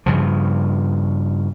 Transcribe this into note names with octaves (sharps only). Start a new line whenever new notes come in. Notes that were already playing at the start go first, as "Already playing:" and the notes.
G2 C#3 F3